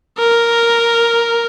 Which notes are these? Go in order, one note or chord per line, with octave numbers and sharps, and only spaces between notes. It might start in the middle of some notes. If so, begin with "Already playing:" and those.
A#4